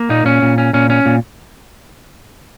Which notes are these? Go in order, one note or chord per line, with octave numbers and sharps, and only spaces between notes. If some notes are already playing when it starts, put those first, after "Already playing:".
Already playing: A#3
A#2 D#4
A#2 C#4
A#2
C#4
A#2 C#4
C#4
A#2